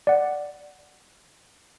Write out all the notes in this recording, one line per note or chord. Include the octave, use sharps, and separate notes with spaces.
D5 F#5